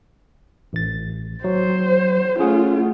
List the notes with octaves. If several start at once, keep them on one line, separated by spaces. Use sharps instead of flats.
A1 A6
F#3 C5
A3 C#4 F4 G#4 F#5